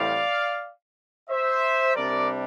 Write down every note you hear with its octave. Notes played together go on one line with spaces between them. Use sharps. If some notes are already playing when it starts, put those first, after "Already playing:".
Already playing: A2 E3 G3 C4 D5 F5
C5 E5
C2 C3 G3 D4 A#4 D5